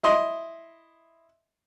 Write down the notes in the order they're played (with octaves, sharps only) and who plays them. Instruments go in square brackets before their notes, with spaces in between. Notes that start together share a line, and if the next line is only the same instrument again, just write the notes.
[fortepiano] E4 D#5 C6